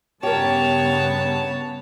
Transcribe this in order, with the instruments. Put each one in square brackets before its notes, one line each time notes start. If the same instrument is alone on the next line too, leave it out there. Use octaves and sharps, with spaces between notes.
[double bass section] G2 C#3 B3 [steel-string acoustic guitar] G4 A#4 [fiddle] C#5 [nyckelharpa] A5